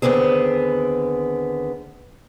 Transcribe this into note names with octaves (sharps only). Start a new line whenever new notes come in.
D#2 D3 B3 C4 G#4